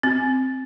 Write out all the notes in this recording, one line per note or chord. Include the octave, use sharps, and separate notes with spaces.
C4